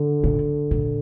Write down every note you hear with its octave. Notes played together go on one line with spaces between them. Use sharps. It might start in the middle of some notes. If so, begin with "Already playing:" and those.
Already playing: D3
A#2
A#2